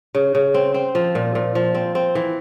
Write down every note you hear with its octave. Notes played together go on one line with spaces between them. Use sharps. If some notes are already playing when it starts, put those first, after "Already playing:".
C#3
C#3
C4
C4
F3
A#2
A#2
F3
C4
C4
E3